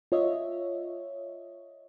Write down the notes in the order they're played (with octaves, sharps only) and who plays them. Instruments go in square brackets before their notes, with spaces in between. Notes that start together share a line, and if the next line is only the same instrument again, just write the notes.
[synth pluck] F4 C#5 D#5 E5